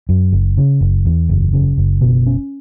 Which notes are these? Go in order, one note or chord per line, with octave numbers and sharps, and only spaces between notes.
F#2
F#1
C#3
F#1
E2
F#1
C#3
F#1
B2
C#4